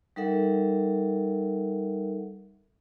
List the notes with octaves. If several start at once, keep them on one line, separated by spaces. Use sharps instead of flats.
G3 D#4 A4 A#4 E5 F#5